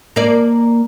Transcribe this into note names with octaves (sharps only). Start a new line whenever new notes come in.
A#3 D5